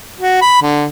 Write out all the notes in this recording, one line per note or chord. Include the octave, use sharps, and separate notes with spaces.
F#4
B5
D3